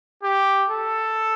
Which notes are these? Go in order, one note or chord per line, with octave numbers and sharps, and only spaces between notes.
G4
A4